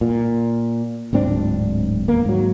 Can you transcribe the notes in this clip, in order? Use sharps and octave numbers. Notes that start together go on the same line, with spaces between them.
A#2
D1 G#2 C4 D4
D#2 A#3
G#2 F#3